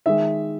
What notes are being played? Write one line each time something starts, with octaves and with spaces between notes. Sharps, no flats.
D#3 G#3 E5